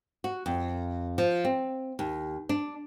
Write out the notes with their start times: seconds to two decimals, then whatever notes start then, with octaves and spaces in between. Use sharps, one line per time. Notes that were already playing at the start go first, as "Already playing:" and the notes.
0.24 F#4
0.46 F2
1.18 F3
1.45 C4
1.99 D#2
2.49 D4